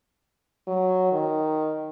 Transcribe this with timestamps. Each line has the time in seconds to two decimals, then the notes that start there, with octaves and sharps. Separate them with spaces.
0.67 F#3
1.13 D#3